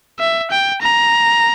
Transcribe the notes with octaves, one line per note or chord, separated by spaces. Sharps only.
E5
G5
A#5